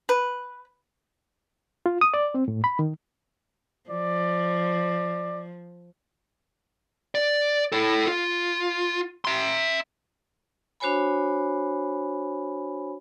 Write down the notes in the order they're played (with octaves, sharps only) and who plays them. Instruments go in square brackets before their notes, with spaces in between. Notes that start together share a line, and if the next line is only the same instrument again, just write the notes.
[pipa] B4
[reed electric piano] F4
D#6
D5
C4
A2
B5
D#3
[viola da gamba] F3 [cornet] D5
[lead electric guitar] D5
E4 A4
F4
E5 C6
[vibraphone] D4 F#4 C5 C#5 G#5 B5